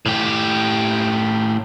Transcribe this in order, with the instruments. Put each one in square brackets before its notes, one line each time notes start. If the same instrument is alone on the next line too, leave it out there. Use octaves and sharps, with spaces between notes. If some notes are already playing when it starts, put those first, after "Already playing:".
[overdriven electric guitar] A2 G4